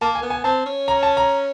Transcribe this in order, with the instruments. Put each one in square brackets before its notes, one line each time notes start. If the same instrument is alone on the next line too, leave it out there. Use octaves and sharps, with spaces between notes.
[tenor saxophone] A#3 [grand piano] A5
[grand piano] G#5
[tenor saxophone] B3
[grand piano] G#5
[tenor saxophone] C4 [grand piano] A5
[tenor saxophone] C#4
[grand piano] A#5
A5
A#5